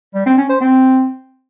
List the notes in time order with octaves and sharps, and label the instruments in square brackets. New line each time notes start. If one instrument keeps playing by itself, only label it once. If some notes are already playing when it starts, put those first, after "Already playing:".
[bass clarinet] G3
C4
C#4
C5
C4